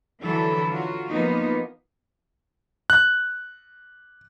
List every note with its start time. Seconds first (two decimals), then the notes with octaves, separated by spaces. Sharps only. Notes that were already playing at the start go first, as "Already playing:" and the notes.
0.22 D3 E3 F#3 E4 A4
0.70 F#3 F4 F#4
1.09 F3 A#3 B3 D#4
2.90 F#6